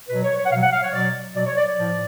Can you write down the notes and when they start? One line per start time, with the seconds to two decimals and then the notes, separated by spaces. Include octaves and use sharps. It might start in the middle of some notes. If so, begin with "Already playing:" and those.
0.09 B2 F#3 B4
0.23 C#5
0.37 C#5
0.45 F#5
0.51 B2 F#3 F5
0.62 F#5
0.72 F5
0.83 C#5
0.92 B2 F#3 D5
1.34 B2 F#3 D5
1.45 C#5
1.56 D5
1.67 D5
1.76 A2 F3